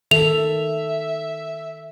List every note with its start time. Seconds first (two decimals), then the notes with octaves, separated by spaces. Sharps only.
0.11 D#3 A4 E5 F7